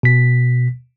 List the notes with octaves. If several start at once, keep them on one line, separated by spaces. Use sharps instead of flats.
B2 B6